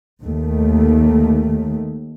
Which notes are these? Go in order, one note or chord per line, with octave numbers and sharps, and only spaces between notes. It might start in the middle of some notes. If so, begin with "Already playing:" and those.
D#2 D#3 A3